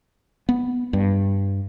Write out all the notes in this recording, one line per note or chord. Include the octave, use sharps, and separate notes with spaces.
B3
G2